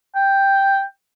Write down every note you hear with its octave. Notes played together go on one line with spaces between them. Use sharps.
G5